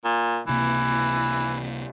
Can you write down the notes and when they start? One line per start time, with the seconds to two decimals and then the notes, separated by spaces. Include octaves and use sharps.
0.04 A#2
0.47 C#2 C3 E3 A#3